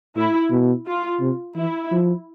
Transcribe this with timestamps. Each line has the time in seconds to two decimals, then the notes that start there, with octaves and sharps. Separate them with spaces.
0.16 A2 E4
0.51 B2
0.86 F4
1.20 C3
1.56 E3 E4
1.91 F3